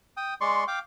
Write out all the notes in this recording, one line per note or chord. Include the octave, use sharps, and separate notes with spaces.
G5 D#6
G#3 D5 C6 C#6
F5 G5 D6